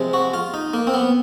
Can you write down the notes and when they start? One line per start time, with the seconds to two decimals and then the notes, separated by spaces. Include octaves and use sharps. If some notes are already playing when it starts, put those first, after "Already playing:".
Already playing: C3 F3 G#3
0.13 F#4
0.34 F4
0.54 D#4
0.73 A#3
0.87 C4
0.94 B3